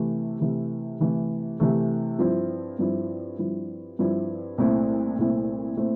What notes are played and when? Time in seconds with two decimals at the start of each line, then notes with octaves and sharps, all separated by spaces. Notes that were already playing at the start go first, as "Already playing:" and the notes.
Already playing: C3 E3 A3
0.40 C3 E3 A3
0.99 C3 E3 A3
1.60 C3 E3 A3
2.19 G2 F3 C4 E4
2.79 G2 F3 C4 E4
3.38 G2 F3 C4 E4
3.99 G2 F3 C4 E4
4.58 C2 A#2 A3 C4 E4
5.19 C2 A#2 A3 C4 E4
5.77 A#2 A3 C4 E4